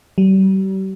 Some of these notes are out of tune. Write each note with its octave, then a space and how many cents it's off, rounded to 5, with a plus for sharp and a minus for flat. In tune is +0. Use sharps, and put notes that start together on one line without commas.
G3 -40